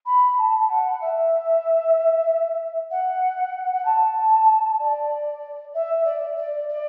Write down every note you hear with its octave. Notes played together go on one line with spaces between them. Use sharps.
B5
A5
F#5
E5
F#5
F#5
A5
D5
E5
D5
D5
D5